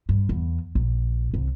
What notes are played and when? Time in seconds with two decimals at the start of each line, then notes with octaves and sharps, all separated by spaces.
0.09 G2
0.29 E2
0.75 A#1
1.34 C2